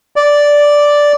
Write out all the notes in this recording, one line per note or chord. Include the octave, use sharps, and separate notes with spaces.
D5